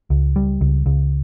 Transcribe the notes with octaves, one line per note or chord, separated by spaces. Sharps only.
C#2
G3
C#2
C#2